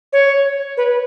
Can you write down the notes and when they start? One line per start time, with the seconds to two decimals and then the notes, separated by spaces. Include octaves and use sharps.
0.13 C#5
0.77 B4